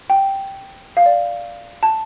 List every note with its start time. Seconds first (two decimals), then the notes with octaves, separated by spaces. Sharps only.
0.10 G5
0.97 F5
1.06 D5
1.83 A5